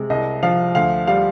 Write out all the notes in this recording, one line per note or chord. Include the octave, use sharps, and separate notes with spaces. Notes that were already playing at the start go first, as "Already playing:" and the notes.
Already playing: C3 G#3
C2 D#5
F3 F5
D2 F5
G3 F5